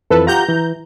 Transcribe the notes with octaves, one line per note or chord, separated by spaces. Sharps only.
F2 E3 F3 A4 B4
F4 G4 F#5 A#5 G6
E3